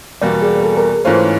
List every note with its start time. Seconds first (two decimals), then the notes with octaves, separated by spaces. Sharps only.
0.22 E2 B2 G3 A#3 D5
0.42 G#4
0.64 A4
0.77 A#4
1.05 G#2 E3 A3 C#4 F4 C5